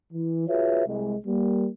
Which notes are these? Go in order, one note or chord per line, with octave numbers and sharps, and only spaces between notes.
E3
F4 F#4 G#4 B4 C#5 E5
C2 G#3
G3 A#3